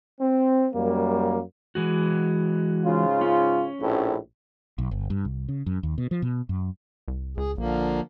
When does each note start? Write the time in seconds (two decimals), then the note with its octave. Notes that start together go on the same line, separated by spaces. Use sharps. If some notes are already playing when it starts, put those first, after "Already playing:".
0.20 C4
0.74 F#2 G3 A#3
1.75 E3 G#3 F#4
2.84 G#2 C#3 F4
3.21 C#4
3.80 A#1 A2
4.78 B1
4.91 G1
5.10 G2
5.25 C2
5.49 C#3
5.66 F#2
5.83 D#2
5.98 B2
6.11 F3
6.22 B2
6.49 F#2
7.08 C2
7.37 C#2 G#4
7.58 A#1 D3 F3 A#3